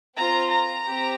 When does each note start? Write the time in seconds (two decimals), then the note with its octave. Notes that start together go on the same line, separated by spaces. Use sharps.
0.17 C4 F4 A#5
0.51 A#5
0.86 C4 G4